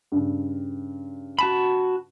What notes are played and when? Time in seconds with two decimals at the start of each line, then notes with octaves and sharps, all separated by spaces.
0.12 G2 C#3
1.39 F#4 A5 B5